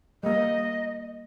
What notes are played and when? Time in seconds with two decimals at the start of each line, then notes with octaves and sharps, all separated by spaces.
0.23 G3 A#3 D#5